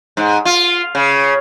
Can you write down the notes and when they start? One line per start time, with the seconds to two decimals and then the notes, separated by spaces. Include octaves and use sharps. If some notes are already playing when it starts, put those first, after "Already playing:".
0.17 G#2
0.45 F4
0.95 C#3